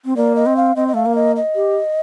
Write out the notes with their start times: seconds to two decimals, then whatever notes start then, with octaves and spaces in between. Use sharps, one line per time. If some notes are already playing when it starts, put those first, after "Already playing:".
0.05 C4
0.16 A#3 D5
0.36 D#5
0.46 C4
0.56 F5
0.76 C4 D#5
0.88 D#5
0.94 A3 F5
1.06 A#3
1.15 D#5
1.36 D#5
1.55 G4